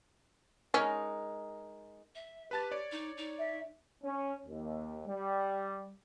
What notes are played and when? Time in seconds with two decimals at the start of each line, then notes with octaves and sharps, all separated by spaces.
0.74 G#3 C#4 D#4 A#4
2.15 E5
2.51 G4 B4 A5 A6
2.71 C#5 D5
2.92 D#4
3.17 D#4
3.39 E5
4.03 C#4
4.47 D#2
5.06 G3